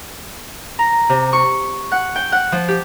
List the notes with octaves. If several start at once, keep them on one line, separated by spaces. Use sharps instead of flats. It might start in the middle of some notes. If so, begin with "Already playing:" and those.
A#5
C3
C#6
F#5
G5
F#5
F3
G4